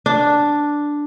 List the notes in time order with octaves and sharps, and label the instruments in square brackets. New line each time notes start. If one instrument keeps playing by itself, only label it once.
[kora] D4